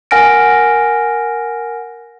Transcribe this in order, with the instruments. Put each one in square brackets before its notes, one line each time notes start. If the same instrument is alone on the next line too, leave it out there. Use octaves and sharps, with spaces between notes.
[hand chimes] A#4 F#5 G#5 F6 A#6 D7